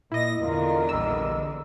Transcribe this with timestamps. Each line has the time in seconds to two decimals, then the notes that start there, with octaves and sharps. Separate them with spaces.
0.12 A#2 E4 D#5 A#6
0.41 E2 D3 F4 A#4
0.89 A#1 G3 A#4 D#5 E6